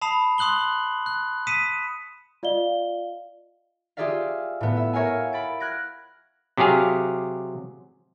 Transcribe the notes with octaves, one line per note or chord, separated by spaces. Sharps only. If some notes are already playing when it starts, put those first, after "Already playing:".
A5 B5 D#6 C7 F7
C6 D#6 F#6 F#7 G7
F#6
D#6 B6 C#7 D#7 E7
F4 D5 D#5 F5 G7
F4 G4 G#4 D5 E5 F5
A2 B3
E5
A#4 C#5 E5 F5 G#5
B5 A6 D7
F6 F#6 G#6 A#6 D7
C3 F#3 G4 G#4 F5